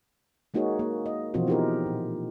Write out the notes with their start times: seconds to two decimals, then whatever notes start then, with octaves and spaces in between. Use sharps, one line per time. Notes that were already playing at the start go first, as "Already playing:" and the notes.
0.54 G#3 A#3 D#4 F#4 G#4 C#5
0.79 A#3
1.06 D#5
1.34 B2 E3 F3 C4 F4 F#4
1.47 B3 D#4 E4 G4 G#4 A#4
1.86 A#2